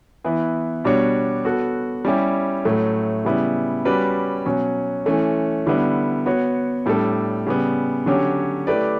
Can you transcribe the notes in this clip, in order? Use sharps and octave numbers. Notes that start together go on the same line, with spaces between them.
E3 B3 E4
B2 G3 D4 F#4 C#5
B3 F#4 A4
G3 C#4 E4 G4
A2 F#3 A3
C#3 G3 B3 E4
G3 C#4 F#4 B4 D5
B2 F#3 C#4
E3 A3 C#4
D3 G3 B3 E4
B3 F#4 C#5
A2 G3 D4 A4
C#3 G3 B3
D3 F#3 C#4 G4 C#5
A3 E4 G4 B4 D5